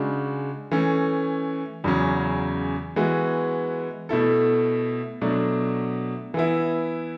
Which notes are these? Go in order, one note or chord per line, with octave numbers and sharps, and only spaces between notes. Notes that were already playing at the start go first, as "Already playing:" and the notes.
Already playing: C#3 G#3 D4 F#4
E3 A3 C#4
E2 C#3 F#3 C#4
E3 G#3 B3 F#4
B2 A3 E4 A4
B2 F#3 A3 D4
E3 B3 E4